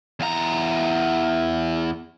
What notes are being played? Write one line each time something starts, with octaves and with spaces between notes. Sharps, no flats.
E2 A#5